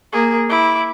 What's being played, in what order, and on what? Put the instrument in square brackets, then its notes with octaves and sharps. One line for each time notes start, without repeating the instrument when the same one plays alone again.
[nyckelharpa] A#3 G#4
E4 D6